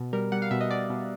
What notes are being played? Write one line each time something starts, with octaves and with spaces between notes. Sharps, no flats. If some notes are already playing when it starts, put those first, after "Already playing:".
Already playing: B2
G3 A#4
G3 F#5
F5
B2 E5
D#5
B2 D5
B2